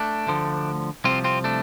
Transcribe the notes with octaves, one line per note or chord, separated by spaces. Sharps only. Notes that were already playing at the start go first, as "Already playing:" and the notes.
Already playing: A3 D4
D2 D3 F3
C2 C3 F3 C4 F4
C4 F4
A3 D4